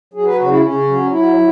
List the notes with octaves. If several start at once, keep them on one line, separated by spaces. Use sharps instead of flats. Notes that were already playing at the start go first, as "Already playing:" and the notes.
F#3 G#4
B4
C#3 F#4
E4
C#3 C#4
F#3
F#3 E4
F#3